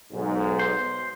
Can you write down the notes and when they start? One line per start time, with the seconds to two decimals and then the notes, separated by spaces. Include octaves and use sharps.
0.13 B1 G#2
0.59 C5